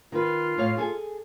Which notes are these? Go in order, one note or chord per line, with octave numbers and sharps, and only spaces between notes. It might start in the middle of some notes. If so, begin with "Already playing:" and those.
D#3 F4 B4
A2 C#5 F5
G#4 A4 G#5